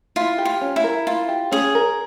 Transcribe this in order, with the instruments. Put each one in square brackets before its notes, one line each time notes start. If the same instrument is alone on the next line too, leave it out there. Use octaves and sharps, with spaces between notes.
[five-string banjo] E4 [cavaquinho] F4
[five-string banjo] G4
[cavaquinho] F4
[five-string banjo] C#4
[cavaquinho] E4
[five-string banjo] A#4
[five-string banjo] E4 [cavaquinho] F4
[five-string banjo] G4
[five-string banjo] C#4 [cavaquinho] G#4
[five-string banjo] A#4